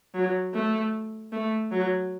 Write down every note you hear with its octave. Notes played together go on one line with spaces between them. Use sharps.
F#3
A3
A3
F#3